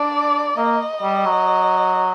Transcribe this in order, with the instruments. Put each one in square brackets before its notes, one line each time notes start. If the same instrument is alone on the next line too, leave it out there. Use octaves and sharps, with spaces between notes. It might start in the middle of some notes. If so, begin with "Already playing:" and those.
Already playing: [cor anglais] D4 [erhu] D5
[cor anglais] A#3 [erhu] D#5
[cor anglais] G3
F#3